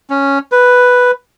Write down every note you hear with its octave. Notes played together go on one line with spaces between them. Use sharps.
C#4
B4